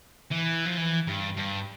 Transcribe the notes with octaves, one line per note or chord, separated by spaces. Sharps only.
E3
F3
E3
G2
G2